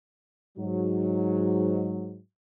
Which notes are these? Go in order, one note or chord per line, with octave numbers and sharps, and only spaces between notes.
G#2 F#3